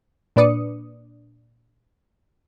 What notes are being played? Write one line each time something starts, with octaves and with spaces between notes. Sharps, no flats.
A#2 D4 B4 D5 D#6 C#7